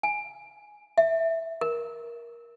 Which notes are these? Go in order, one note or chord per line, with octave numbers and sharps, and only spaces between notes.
G#5
E5
A#4